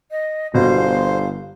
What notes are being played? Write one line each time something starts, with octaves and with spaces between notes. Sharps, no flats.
D#5
G1 B2 C5 F5 C6